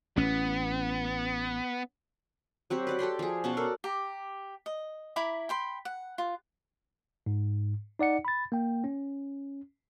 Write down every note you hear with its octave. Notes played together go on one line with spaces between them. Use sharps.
A1 B3 C#4
F#3 C4 F#4 G4
B4 D5 F#5
G4 A4 G5 C6
F3 G#4
B2 C#4 F#5 A5
A4 A#4 D5
G4 A#5
D#5
E4 A#5 B5 D6
G5 B5 C6
F#5
F4
G#2
D#4 D5 F#5 C#7
B5 A6
A#3 G5
C#4